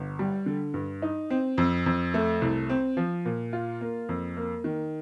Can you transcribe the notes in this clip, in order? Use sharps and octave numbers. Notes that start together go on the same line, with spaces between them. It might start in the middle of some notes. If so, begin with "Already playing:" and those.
Already playing: G1
G3
D3
G2
D#4
C4
F2
F2
A3
C2
C4
F3
A#2
F4
A#3
F2
A#3
D#3